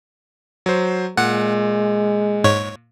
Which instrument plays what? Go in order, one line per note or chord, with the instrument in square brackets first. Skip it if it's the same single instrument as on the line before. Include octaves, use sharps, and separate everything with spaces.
[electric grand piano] F#3 C5
[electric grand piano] A#2 [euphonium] G#3 [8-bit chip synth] F#5
[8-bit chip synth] G#2 C#5